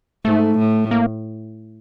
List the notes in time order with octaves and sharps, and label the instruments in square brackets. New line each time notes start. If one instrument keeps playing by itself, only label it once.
[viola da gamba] G#2 [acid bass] A3
[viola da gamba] A2
[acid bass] A#3